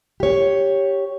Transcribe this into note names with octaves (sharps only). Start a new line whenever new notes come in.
G4 C#5